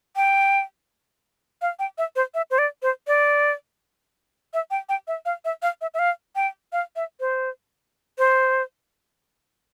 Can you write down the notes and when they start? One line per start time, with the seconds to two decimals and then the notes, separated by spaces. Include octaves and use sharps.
0.16 G5
1.62 F5
1.79 G5
1.98 E5
2.16 C5
2.34 E5
2.51 C5
2.58 D5
2.82 C5
3.07 D5
4.54 E5
4.71 G5
4.89 G5
5.08 E5
5.26 F5
5.45 E5
5.62 F5
5.81 E5
5.94 E5
5.99 F5
6.36 G5
6.72 F5
6.96 E5
7.20 C5
8.18 C5